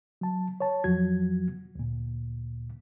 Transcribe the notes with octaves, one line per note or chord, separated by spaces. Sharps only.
F#3 A5
C#5 A5
F2 F3 F#3 F#4 G#6
D2 A#2